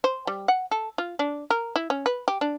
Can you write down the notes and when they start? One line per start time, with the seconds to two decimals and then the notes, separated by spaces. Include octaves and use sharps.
0.04 C5
0.27 G3
0.48 F#5
0.71 A4
0.98 F4
1.19 D4
1.50 A#4
1.76 E4
1.90 C#4
2.06 B4
2.28 G4
2.41 D4